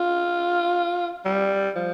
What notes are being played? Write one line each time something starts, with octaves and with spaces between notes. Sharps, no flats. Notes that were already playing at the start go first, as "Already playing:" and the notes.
Already playing: F4
G3
F3